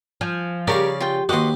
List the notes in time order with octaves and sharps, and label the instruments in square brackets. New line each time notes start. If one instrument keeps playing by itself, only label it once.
[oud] F3 [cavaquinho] G#5
[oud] C#3 G4 [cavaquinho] A#4 C#5 A#5 [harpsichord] D5 F5
[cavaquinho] F4 G5
[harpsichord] D#2 G4 [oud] B3 F#4 [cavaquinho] D#5 C6